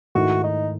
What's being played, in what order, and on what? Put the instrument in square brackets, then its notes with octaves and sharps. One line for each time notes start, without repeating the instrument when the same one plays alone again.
[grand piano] G#2 D#3 A3 E4 [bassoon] F#4
[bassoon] D#4